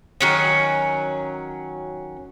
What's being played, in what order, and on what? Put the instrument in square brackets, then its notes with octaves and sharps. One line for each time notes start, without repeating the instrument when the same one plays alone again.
[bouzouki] D#3 F#3 C#4